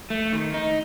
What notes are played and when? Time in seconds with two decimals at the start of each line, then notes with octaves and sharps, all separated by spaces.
0.10 A3
0.33 D#3
0.54 D#4